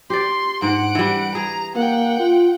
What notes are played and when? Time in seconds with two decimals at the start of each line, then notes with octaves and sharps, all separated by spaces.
0.10 G4 D5 C6
0.62 G#2 F#5 D7
0.95 E3 G3
1.35 G#4 A#5
1.76 A#3 F#5 G5
2.19 F4